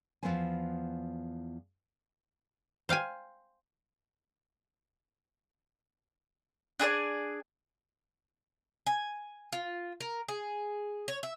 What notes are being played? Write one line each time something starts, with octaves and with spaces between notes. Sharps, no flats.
E2 G#2 F3 B3 C5 G#5
C5 F5 G5 G#5
D4 G#4 C5 D5
G#5
F4
A#4
G#4
C#5
E5